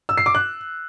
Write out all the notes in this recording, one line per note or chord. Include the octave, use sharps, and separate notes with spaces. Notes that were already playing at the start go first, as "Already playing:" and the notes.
E6
C7
D6
F#6